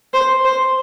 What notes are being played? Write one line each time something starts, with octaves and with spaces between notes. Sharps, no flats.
C5
C5